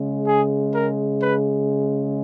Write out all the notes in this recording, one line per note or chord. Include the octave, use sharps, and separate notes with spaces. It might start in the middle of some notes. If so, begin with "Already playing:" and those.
Already playing: C#3 G#3
G#4
A#4
B4